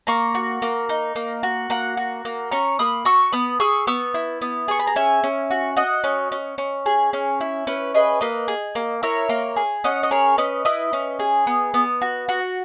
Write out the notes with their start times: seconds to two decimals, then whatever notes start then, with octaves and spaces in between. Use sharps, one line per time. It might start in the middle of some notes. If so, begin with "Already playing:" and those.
0.07 A#3 A#5 C#6
0.35 F#4
0.62 A#3
0.89 D#4
1.16 A#3
1.43 F#4
1.70 A#3 F#5 A#5
1.97 F#4
2.25 A#3
2.51 C#4 A#5 C#6
2.79 A#3 B5 D#6
3.05 F#4 C#6 E6
3.33 B3 B5 D#6
3.60 G#4 C#6 E6
3.87 B3 C#6 E6
4.14 E4
4.42 B3
4.68 G#4 C#6
4.79 B5
4.87 A#5
4.96 C#4 E5 G#5
5.24 C#4
5.51 F#4
5.77 F#4 D#5 F#5
6.04 C#4
6.32 C#4
6.58 C#4
6.86 G#4
7.13 C#4
7.41 E4
7.67 C#4 B4
7.94 G#4 B4 D#5
8.21 A#3 B4 D#5
8.48 G#4
8.75 A#3
9.03 E4 A#4 C#5
9.29 A#3
9.56 G#4
9.84 C#4 D#5 F#5
10.03 D#5
10.11 G#4 A#4 C#5
10.38 C#4 B4 D#5
10.65 E4 B4 D#5
10.93 C#4
11.19 G#4
11.47 B3
11.74 B3
12.02 F#4
12.29 F#4